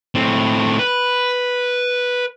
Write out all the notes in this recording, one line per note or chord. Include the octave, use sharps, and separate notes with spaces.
A2 C4
B4